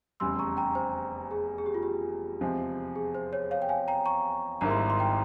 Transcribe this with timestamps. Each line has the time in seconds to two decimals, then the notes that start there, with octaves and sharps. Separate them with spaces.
0.20 F1 E2 C#3 G3 C6 E6
0.39 A#5 C#6
0.57 G5 A#5
0.75 C5
1.31 G#4
1.58 G#4
1.66 G4
1.74 F4
1.83 G4
2.41 E2 C3 F3 G#3 C4
2.96 G#4
3.15 C5
3.33 C#5
3.51 C#5 F5
3.62 G5
3.69 F5 G#5
3.88 G5 A#5
4.06 A#5 C#6
4.61 G#1 G#2 G3 A#3 E4 A#5
4.70 C6
4.80 A#5
4.90 C6
4.99 G5 A#5